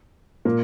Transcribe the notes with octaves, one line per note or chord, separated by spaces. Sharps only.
A#2 A#3